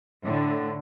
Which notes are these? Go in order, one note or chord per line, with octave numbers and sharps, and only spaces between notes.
A2 D3